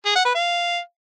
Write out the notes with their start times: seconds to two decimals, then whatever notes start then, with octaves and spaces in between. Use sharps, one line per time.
0.06 G#4
0.15 F#5
0.25 B4
0.35 F5